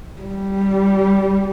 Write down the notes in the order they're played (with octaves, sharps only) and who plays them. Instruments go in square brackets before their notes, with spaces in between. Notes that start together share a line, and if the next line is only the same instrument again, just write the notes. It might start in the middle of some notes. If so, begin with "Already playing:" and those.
[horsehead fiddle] G3